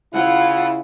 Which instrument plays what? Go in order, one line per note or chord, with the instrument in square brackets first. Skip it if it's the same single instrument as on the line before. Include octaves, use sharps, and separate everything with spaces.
[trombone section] C#3 E4 [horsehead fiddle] F4 F#5